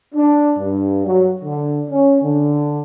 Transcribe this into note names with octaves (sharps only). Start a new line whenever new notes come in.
D4
G2
F#3
D3
C#4
D3